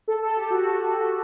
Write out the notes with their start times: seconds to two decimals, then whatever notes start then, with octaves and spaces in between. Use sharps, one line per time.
0.08 A4
0.22 A4
0.37 G4
0.50 F#4